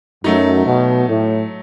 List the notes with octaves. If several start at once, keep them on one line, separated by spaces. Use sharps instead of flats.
F#2 F#3 A3 D#4
B2
A2